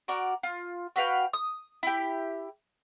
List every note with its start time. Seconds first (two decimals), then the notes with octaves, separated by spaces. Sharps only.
0.08 F#4 A#4 D5
0.43 F4
0.96 F#4 B4 F5 G5
1.33 D#6
1.83 E4 G4